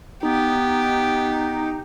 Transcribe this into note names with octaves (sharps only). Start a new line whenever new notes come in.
B3 D#4 G4